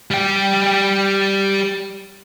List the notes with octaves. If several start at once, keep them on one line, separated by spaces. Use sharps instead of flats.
G3 G5